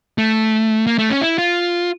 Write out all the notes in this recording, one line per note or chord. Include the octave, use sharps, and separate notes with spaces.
A3
A#3
A3
C#4
E4
F4